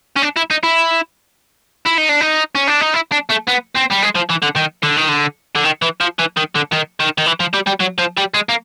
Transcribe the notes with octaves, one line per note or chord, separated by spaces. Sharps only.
C#4
D4
E4
D#4
E4
E4
D#4
D4
D#4
C#4
D4
D#4
E4
D4
A3
B3
C4
G3
G#3
F3
E3
D3
D#3
D3
D#3
D3
D3
D#3
E3
F3
E3
D#3
D3
D#3
D#3
D#3
E3
F3
G3
G3
F#3
F3
G3
G#3
A#3